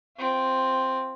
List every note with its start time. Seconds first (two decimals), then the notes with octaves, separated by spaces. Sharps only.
0.17 C4 F4